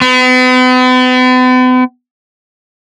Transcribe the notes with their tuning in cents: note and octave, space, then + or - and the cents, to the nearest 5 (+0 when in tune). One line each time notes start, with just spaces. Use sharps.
B3 +45